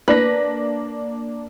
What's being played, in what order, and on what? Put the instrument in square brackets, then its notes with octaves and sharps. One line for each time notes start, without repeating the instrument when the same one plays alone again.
[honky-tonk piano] A#3 D4 A#6 [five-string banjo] B4